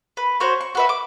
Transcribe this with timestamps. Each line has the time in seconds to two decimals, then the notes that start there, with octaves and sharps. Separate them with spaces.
0.17 B4
0.40 F#4 C5 C#5
0.61 C#6
0.75 F#4 B4 E5
0.89 D6